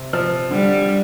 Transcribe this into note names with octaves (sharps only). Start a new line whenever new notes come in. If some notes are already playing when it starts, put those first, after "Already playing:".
Already playing: C3
F3
D3 G3